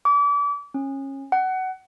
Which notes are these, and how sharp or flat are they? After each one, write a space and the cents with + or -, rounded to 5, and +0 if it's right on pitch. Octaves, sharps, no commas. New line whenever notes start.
D6 -35
C#4 -25
F#5 +20